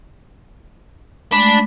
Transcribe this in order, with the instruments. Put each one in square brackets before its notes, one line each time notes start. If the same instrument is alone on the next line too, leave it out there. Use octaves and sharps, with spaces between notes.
[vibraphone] G#3 A3 [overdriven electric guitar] D4 [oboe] B5